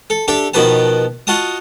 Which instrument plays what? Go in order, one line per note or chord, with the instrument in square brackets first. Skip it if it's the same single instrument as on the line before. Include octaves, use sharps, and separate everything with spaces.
[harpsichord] A4
D4 G4 A4 E5
B2 D#3 F3 B4 A5
F4 F#4 D#5 A5 D#6